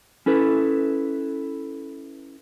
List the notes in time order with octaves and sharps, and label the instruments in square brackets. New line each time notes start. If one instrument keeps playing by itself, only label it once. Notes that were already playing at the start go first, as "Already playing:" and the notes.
[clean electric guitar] C#4 E4 A4 B4